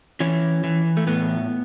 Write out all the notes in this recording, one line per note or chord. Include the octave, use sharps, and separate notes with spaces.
E3 C#4
E3
A3
A2 B3